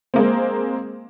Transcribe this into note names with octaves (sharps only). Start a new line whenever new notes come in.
G#3 A#3 C4